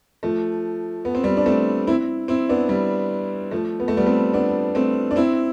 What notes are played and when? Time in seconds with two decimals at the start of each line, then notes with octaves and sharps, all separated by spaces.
0.23 F3 A3
1.05 B3
1.15 C4
1.23 G3 B3
1.37 D4
1.46 A3 C4
1.87 C4 E4
2.28 C4 E4
2.49 B3 D4
2.69 G3
3.51 F3 A3
3.80 B3
3.88 A3
3.97 G3 B3
4.06 A3 C4
4.33 B3 D4
4.75 A3 C4
5.11 D4
5.16 C4 E4